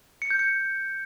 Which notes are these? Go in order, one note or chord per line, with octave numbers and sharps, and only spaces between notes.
C#7
G6
C#7